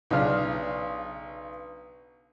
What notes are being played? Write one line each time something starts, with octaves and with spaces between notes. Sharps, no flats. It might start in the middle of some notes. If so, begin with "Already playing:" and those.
B1 C#3 D4 F6